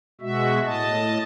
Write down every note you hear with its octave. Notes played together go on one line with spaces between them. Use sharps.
B2 G#3 F#4 E5
A2 D#5 A5